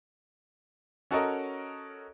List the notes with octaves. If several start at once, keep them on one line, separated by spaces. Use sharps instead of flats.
C#4 F#4 A4 A#4 C#5 D#5